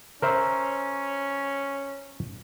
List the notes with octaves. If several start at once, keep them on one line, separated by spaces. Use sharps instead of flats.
C#4 A#4 C5 E5